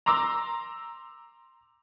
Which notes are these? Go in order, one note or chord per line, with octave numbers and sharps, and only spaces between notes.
A#5 C6 D6 E6